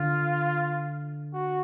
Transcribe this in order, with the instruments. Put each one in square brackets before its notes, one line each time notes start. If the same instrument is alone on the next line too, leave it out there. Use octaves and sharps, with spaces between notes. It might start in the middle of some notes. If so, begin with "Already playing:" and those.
Already playing: [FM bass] D3 [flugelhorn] F4
[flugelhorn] F#4